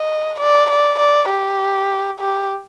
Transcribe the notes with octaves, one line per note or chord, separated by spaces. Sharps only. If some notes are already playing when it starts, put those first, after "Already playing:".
Already playing: D#5
D5
D5
D5
G4
G4